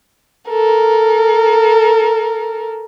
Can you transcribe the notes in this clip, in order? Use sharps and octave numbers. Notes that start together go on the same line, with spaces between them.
A4 A#4